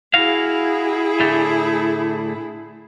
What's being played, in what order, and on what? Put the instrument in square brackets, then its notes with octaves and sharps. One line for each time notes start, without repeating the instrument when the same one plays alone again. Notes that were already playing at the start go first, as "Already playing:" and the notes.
[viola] E4 G#4 [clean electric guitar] F#4 F5
[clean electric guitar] A2 D3 A3